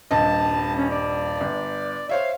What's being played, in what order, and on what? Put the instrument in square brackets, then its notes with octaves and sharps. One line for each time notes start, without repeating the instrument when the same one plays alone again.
[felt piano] D#1 G2 D#5 [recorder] A5
[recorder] C#4
D5
[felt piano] G1
[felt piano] C5 C#5 E5 [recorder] F5